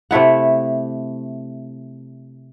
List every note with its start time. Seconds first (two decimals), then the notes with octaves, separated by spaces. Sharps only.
0.11 C3 A3 E4 F#5